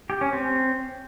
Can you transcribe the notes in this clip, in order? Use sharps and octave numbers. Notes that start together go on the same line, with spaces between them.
G4
C#4
C4